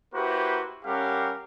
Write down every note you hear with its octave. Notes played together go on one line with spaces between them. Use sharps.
A#3 E4 F#4 G4 B4 C5
G3 C#4 G4 A#4 F5 F#5